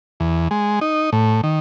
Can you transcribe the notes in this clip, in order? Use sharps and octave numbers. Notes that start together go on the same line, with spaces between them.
E2
G#3
D#4
A2
D#3